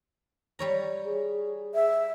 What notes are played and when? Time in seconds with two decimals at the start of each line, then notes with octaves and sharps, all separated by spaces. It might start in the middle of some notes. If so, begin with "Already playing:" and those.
0.59 G3 C#5 A#5
1.06 G#4
1.75 E5